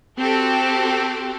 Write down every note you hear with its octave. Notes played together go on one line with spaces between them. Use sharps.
C4 F#4 G4 A4